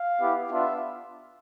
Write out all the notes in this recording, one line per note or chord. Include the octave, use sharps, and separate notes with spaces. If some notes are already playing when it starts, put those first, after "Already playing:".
Already playing: F5
B3 E4 G4
B3 D4 F4 E5